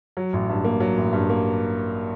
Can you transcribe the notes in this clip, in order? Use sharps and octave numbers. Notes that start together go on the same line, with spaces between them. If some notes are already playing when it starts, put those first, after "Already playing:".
F#3
A1
G2
A#3
F#3
A1
G2
A#3